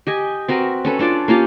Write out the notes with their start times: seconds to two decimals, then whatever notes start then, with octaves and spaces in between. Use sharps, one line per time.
0.07 G4 D#5 G#5
0.48 C4 F#4 A#4 B4
0.85 C#4 A4 B4
0.99 C#4 D4 F4 D5
1.28 A#3 C#4 F4 G4